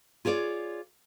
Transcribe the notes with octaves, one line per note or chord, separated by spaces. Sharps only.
F4 G#4 C#5 D5